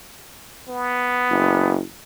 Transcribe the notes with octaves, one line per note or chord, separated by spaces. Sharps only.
B3
F#1